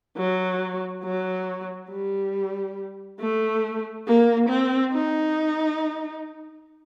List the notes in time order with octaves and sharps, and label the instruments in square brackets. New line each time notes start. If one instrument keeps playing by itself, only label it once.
[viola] F#3
F#3
G3
A3
A#3
C4
D#4